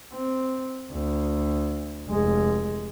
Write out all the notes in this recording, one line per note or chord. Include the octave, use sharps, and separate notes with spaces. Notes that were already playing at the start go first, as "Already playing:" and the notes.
C4
D2
F1 G#3